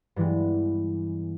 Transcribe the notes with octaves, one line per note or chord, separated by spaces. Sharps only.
G2 E3 G#3 B3